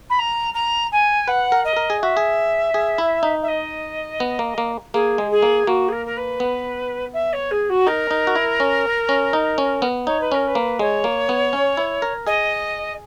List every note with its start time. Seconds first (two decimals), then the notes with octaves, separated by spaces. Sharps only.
0.09 B5
0.18 A#5
0.54 A#5
0.92 G#5
1.28 B4 F#5
1.52 A#4
1.64 D#5
1.76 A#4
1.90 G#4
2.01 F#4 E5
2.17 G#4
2.74 G#4
2.98 E4
3.23 D#4
3.42 E5
3.47 D#5
4.20 B3
4.39 A#3
4.58 A#3
4.93 A#3 G#4
5.18 G#3
5.30 G#4
5.42 A#3
5.67 A#3 F#4
5.88 G#4
5.92 A#4
6.05 A#4
6.16 B4
6.40 B3
7.13 E5
7.32 C#5
7.51 G#4
7.69 F#4
7.87 D#4 A#4
8.11 D#4
8.27 F#4
8.36 E4
8.60 C#4
9.09 C#4
9.33 D#4
9.58 C#4
9.82 B3
10.06 D#4 C#5
10.20 B4
10.32 C#4 A#4
10.47 B4
10.55 A#3
10.79 G#3 C#5
11.04 A#3
11.29 B3
11.53 C#4
11.77 E4
12.02 A#4
12.26 G#4 D#5